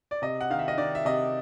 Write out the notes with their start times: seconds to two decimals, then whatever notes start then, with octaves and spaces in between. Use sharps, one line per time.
0.11 D5
0.22 C3 D#5
0.41 F#5
0.50 D#3 F5
0.59 E5
0.68 D#5
0.78 D#3 D5
0.95 E5
1.05 C3 D#5